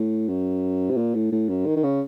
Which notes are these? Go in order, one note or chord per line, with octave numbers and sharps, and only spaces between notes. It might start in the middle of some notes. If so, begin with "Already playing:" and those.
Already playing: A2
F#2
C3
A#2
A2
A2
F#2
D#3
D#3
C#3